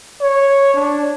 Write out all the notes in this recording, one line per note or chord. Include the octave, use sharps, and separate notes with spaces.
C#5
D4